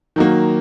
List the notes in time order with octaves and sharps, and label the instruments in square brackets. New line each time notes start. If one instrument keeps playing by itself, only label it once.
[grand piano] D#3 F#3 A#3